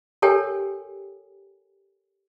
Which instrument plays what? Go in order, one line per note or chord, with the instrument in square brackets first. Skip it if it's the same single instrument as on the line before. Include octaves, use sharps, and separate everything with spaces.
[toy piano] G4 A4 A#4 C#5 G5 G#5